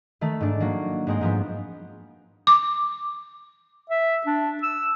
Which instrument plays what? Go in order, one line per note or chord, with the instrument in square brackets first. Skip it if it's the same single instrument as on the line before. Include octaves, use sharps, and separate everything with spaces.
[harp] D#3 A3
G#2 D4
F#3 A#3
G#2 G#3 C4
G#2 F3 B3
[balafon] D6
[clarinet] E5
D4
E6